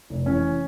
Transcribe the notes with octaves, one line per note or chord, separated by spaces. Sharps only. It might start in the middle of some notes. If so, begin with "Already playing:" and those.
F1
E3 C#4